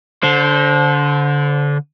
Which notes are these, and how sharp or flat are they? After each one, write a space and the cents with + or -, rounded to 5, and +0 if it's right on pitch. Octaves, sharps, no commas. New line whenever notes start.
D3 -25 C5 +0